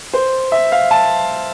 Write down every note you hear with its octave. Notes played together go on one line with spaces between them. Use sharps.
C5
E5
F5
A5